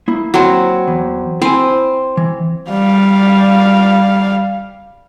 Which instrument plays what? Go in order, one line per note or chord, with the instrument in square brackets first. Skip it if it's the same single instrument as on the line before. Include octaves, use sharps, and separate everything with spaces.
[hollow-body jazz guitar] A#3 E4
[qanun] F#3 C4
[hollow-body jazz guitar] E2
[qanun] C4 [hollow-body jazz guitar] E4 G#5
[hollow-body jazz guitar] E3
[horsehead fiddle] G3 F5